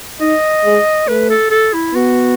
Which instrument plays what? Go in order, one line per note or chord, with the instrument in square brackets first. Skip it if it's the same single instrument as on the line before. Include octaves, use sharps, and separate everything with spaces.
[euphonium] D#4 [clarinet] D#5
[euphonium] G#3
[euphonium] A3 [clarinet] B4
[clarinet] A4
A4
E4
[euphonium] B3 [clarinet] F#4